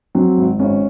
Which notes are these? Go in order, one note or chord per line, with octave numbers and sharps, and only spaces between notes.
F#3 C4
G#1
G#1 C#4